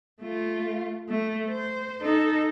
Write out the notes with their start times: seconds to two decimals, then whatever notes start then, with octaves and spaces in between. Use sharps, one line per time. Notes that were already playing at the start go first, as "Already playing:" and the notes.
0.22 A3 F4
1.08 A3
1.49 C5
2.01 D#4 A4